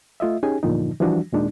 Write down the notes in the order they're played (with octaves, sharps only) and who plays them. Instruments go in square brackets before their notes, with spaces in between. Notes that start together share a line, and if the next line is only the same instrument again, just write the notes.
[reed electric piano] A3 F4 D#5 E5
C#4 D#4 G4 G#4 G#5
E2 G2 A#2 D3 F3 D#4
E3 F3 G3 D4 F#4
D#2 A#2 G#3 D4 D#4